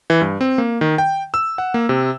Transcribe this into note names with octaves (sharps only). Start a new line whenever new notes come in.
E3
G2
C4
A#3
D#3
G5
E6
F#5
A#3
C3